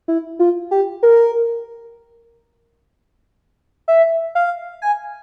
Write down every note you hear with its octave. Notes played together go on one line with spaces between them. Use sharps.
E4
F4
G4
A#4
E5
F5
G#5